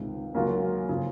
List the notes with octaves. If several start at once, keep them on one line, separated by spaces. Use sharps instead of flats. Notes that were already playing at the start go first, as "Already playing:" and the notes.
Already playing: C#2 C3 D#3 G#3
C#2 C#3 F#3 A#3 F4
C#3 F3